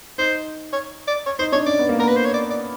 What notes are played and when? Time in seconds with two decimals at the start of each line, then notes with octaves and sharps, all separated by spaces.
0.18 D#4 C5
0.73 C#5
1.07 D5
1.26 C#5
1.39 D#4 C5
1.52 D4 C#5
1.66 C#4 D5
1.79 B3
1.89 A#3
1.99 B3 A#4
2.08 B4
2.17 C5
2.25 C#5
2.34 D5
2.51 D5